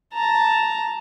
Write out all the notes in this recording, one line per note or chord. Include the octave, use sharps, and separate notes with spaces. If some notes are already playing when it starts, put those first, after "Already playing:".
A5 A#5